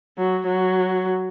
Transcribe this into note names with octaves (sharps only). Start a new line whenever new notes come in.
F#3
F#3